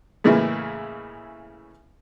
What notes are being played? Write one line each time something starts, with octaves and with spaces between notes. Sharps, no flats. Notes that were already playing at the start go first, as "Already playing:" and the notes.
A2 C#3 E3 G#3 A#3 E4